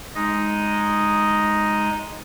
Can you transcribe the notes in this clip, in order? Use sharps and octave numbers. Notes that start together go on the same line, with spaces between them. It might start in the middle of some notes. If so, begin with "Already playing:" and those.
G#3 D#4 D#5